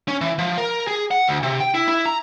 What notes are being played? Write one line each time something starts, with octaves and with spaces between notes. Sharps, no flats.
C#4
E3
F3
A#4
G#4
F#5
D2
C3
G5
E4
E4
A#5